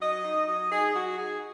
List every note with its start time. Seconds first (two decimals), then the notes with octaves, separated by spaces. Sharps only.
0.01 F#3 D#5
0.24 D#4
0.48 F#3 D#5
0.70 D#4 G#4
0.94 F#3 F#4
1.17 D#4 G#4